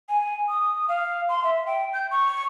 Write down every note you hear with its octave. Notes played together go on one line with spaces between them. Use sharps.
G#5
D#6
F5
C6
E5
G5
G6
C#6